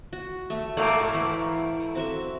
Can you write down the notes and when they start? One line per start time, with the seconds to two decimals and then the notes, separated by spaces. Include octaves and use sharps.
0.13 F#4
0.50 A3 E5
0.77 G#2 A3 A#3 A4 F#5
1.14 E3 B5
1.95 C4 F#4 E5